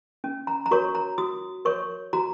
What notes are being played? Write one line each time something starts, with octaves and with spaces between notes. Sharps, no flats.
C#4
A#5
A#5
F#4 A#4 C#5 C#6
A#5
F#4 D#6
A#4 C#5 C#6
F#4 A#5